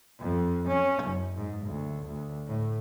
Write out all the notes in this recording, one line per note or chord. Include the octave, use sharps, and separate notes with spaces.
F2
C#4
F#1
G#2
D2
D2
A2